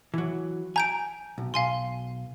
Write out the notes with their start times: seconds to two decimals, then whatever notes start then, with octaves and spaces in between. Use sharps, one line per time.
0.14 E3 F#3
0.76 G#5 A#5 G6 D7
1.38 B1
1.54 B1 F5 G#5 C6